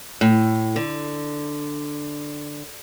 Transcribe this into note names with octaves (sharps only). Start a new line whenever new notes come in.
A2
D3